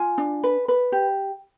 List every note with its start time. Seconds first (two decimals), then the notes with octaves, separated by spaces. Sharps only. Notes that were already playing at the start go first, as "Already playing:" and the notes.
Already playing: F4 G#5
0.18 D4
0.43 B4
0.68 B4
0.92 G4